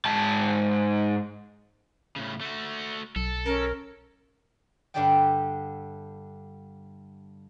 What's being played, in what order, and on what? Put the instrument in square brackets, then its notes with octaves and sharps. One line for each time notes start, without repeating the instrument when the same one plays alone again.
[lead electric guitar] G#2 A5
[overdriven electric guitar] A2 C#3
A3 F#4
[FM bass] B1 [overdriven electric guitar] A4
[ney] C#4 [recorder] A#4
[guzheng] G2 D3 D4 G4 D5 G5